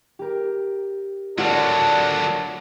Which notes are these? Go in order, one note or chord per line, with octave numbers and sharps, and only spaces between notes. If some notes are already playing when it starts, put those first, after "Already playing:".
G4 A#4
D3 F#3 D4 F4 A#4 D5 F#5 A5